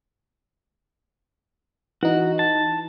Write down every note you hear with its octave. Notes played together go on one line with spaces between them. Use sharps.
E3 D#4 F#4
A5